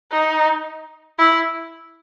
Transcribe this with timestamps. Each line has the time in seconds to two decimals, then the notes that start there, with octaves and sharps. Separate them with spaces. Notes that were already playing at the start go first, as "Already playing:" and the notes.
0.11 D#4
1.18 E4